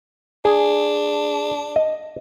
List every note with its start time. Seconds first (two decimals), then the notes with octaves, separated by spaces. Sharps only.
0.45 D4 G#4
1.76 D#5